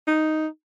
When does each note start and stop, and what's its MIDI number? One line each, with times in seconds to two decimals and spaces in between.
0.07 0.47 63